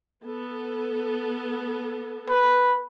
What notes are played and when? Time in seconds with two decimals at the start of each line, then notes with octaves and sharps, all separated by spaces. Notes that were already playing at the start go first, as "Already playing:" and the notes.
0.24 B3 A4
2.29 B4